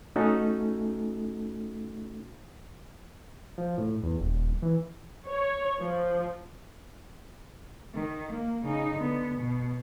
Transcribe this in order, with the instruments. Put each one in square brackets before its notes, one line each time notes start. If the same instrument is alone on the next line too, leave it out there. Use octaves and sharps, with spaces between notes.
[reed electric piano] A3 C#4 D#4 F#4 A4
[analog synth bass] F3
A2
E2
D#1
E3
[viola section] C#5
F3
[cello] D#3
A#3
C#3 D#4
D3 B3
B2